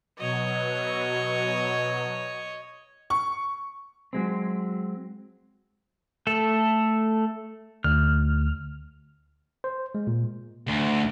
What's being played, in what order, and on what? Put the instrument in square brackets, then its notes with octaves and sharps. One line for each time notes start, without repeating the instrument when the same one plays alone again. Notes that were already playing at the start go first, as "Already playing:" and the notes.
[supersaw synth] B2 F#3 [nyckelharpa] C#5 D#5
[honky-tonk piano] C#6
[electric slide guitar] F#3 G#3 C4
[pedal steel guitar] A3 A4
[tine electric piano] D2 [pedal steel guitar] F6
[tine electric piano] C5
G#3
A#2
[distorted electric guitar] D2